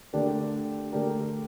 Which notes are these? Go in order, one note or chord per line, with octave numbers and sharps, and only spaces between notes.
D3 A3 D4 G4 A#4
D3 A3 D4 G4 A#4